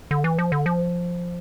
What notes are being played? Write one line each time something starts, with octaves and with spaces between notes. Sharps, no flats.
D3
E3
F3
D3
F3